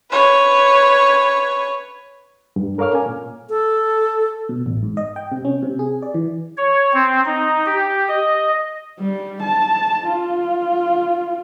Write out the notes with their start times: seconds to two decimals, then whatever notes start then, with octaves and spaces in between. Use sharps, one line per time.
0.11 B4 C#5
2.56 G2
2.78 A4 A#4 C#5 F5 D6 F6
2.93 C#4 G#5
3.06 A#2
3.50 A4
4.49 B2
4.66 A1
4.82 G#2
4.97 D#5
5.16 G5
5.32 C3
5.45 C#4
5.62 C3
5.79 G#4
6.02 D5
6.14 E3
6.57 C#5
6.93 C4
7.26 D#4
7.66 G4
8.08 D#5
9.00 G3
9.42 A5
10.06 F4